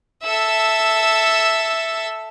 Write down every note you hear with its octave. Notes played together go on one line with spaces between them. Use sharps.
A4 E5